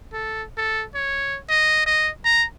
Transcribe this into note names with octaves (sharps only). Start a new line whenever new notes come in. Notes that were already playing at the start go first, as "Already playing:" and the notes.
A4
A4
C#5
D#5
D#5
A#5